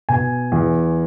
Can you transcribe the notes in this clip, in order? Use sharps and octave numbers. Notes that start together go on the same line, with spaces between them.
B2 G#5
E2